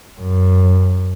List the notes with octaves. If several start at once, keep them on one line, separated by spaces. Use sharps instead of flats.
F#2